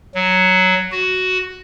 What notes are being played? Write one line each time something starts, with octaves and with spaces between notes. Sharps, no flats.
F#3
F#4